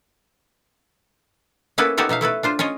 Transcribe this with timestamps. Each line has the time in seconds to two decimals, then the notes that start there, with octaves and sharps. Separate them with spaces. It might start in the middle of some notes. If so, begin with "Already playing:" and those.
1.78 A#3 B3 C#4 E4 A4 B4
1.97 B3 D#4 F#4 G4 A4 C#5
2.09 B2 D#4 E5 F5
2.21 A3 E4 A4 B4
2.43 D4 F4 C5
2.59 C#4 F4 C#5 D#5